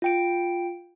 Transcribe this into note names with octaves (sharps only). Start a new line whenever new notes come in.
F4 G5 D7